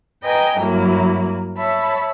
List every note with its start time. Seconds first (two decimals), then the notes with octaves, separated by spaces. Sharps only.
0.21 B4 D#5 G5 G#5 A#5
0.56 G2 F#3 A#3 E4
1.56 C#5 E5 A5 B5